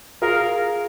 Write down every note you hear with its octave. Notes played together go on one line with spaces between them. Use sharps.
F4 G#4 A#4